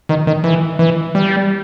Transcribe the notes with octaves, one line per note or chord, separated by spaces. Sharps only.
D#3
D#3
E3
E3
G3